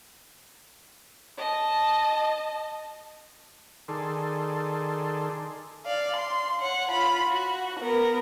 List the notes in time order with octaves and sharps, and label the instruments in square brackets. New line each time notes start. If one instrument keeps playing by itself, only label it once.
[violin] D#5 A5
[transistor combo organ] D#3 G#4 A4 D5 C6
[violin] D5 F5
C6
C#5 F#5
F4 B5
F#4
B3 A#4